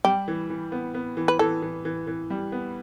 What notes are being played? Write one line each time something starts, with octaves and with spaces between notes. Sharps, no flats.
G3 G4
E3
E3
B3
B3
E3
B4
E3 A4
E3
E3
E3
G3
B3